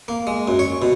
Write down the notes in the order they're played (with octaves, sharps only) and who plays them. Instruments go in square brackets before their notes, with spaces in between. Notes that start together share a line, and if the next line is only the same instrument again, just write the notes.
[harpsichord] A#3
G#3
F#2
C#5
B2